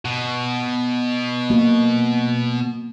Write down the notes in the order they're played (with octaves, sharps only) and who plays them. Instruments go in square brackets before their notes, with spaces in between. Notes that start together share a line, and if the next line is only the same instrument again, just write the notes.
[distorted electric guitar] B2
[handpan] A#3 F#4